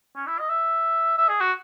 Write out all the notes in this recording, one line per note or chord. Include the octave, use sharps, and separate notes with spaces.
C#4
E4
D#5
E5
E5
G#4
F#4